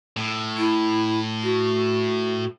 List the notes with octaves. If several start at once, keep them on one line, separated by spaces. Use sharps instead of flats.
A2
E4
F#4